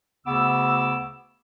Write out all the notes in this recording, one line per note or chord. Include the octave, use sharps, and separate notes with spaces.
D2 C#3 B3 D6 E6